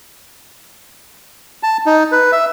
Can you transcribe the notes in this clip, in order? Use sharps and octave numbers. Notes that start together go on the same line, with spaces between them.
A5
D#4
B4
E5